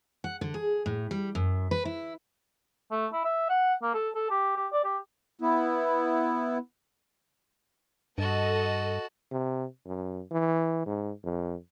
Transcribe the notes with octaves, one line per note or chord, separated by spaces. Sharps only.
F#5
D3
G#4
A2
G3
F#2
B4
E4
A3
E4
E5
F#5
A#3
A4
A4
G4
G4
D5
G4
B3 E4
G2 F#4 A4 D#5 A5
C3
F#2
E3
G#2
F2